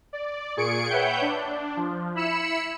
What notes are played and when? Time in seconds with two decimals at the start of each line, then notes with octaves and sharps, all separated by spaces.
0.13 D5
0.57 A#2 G#4 C#6 C#7 D7
0.89 B4 C#5 E5 F#5 G5 G6
1.22 D4
1.76 F3
2.15 E4 B5 E6 C#7 E7